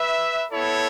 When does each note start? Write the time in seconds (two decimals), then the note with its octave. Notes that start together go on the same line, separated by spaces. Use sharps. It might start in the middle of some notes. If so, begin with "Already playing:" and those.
Already playing: B4 E5
0.52 B3 E4 A4 C#5